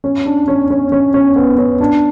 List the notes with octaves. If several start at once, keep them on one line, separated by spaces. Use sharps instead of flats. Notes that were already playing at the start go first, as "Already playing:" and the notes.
C#4
D4
C#4
C#4
C#4
C#4
B3
C#4
D4